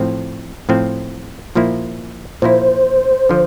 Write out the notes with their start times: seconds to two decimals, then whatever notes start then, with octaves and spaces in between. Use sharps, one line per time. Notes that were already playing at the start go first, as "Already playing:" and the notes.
Already playing: A2 F3 C4
0.69 A2 F3 C4
1.55 A#2 F3 A#3 E4
2.42 A#2 F3 A#3 E4 C5
3.29 D3 F3